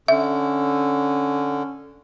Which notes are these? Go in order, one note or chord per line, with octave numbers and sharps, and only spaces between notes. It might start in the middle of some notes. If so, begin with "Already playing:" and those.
D3 C#4 E5